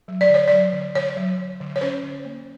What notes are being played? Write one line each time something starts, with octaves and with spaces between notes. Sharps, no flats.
F#3
D5
D3 C#5
F#3 D5
D3
D3 C#5
F#3
D3
D3
C#5
C#4 C5
D3
A#3